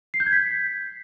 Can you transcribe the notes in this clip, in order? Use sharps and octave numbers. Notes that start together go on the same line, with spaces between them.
C7
G6
G#6
B6